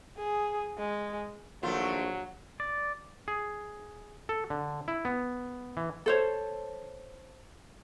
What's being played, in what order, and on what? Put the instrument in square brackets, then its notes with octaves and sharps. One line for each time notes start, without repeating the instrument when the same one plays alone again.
[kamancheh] G#4
G#3
[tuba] A#1 [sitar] D#3 A3 F4 [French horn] F#3
[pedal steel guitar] D5
[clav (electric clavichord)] G#4
A4
D3
E4
B3
E3
[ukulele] A4 C5 C#5